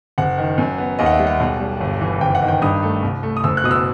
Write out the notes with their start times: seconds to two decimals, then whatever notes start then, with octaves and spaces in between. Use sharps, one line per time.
0.18 F#1 F#5
0.38 D#3
0.58 F#2
0.78 B3
0.99 D#2 D#5
1.06 F#5
1.12 E5
1.20 G3
1.27 F#5
1.39 B1
1.60 G3
1.80 G1
2.01 E3
2.21 F#1 G5
2.35 F#5
2.42 D#3
2.48 G5
2.62 G2 D#6
2.82 A3
3.03 C2
3.23 A3
3.37 D#6
3.44 F#1 E6
3.57 F#6
3.64 B2 D#6
3.71 E6